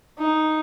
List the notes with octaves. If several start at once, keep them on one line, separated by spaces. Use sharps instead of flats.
D#4